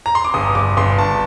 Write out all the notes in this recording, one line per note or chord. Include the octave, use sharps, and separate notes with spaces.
A#5
C6
D6
G1 D#6
G1 D6
G1 C6
G1 A5